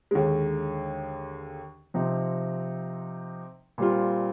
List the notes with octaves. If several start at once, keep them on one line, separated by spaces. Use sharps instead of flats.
D#2 D3 G#3
C3 F3 C4 D#4
A#2 G3 C4 F4